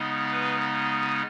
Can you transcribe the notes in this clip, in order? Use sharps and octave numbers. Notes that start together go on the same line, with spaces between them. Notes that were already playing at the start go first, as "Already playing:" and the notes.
Already playing: C#3 G#3 B3 D#4
B4